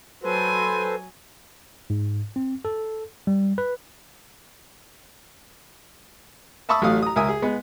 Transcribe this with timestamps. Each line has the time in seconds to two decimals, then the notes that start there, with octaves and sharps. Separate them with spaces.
0.23 F#3 A4 B4 C5 G#5
1.90 G#2
2.36 C4
2.65 A4
3.27 G3
3.58 B4
6.69 E5 A5 B5 C#6 D#6 E6
6.82 A1 F#3 A3 F5 D#6
7.02 A#5 D#6
7.16 C#2 A#4 E5 G#5 D#6
7.28 G#4
7.42 G#3 B3